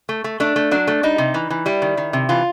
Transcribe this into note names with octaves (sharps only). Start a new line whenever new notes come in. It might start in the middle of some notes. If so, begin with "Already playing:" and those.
A3
A3
A3 D4
A3
F#3 D4
A3
G3 D#4
C3
E3
E3
G3 E4
D#3
D#3
C3
E3 F4